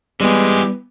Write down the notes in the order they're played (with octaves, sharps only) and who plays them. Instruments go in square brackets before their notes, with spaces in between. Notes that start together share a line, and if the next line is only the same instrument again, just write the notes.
[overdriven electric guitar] E3 G4 [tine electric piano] G3 [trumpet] G#3 [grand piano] B3